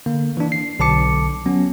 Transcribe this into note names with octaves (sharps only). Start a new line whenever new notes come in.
D3 A#3
E3 D4
C7
B1 D3 A5 D6 C#7
F#3 B3 C#4